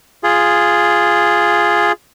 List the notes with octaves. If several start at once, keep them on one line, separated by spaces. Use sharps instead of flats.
F4 G#4